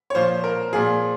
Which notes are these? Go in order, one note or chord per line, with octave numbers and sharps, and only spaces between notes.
C#5
A#2 F3 C5
A#4
A#2 F3 G#4